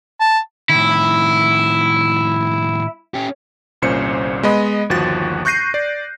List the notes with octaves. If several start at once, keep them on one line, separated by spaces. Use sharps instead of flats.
A5
A2 D#3 E4
C#4 G4
G1 C2 A#2 C#4 C5 C#7
G#3 B3 D#5 B5
G1 D#2 F3 F#4 F#6 A6
C#6 F#6 G6 A#6 C7 D#7
D5